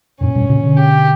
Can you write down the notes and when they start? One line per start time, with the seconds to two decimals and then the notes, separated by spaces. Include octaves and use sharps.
0.21 F#2 A#2 C#4
0.35 G2 B2
0.49 A#2 C#3
0.63 B2 D3
0.77 G4